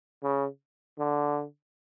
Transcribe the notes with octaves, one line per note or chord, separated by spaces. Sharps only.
C#3
D3